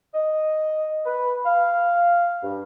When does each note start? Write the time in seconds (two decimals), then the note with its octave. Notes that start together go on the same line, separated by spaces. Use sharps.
0.14 D#5
1.06 B4
1.46 F5
2.43 G2